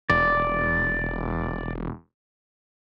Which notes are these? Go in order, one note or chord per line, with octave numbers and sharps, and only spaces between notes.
E1 D5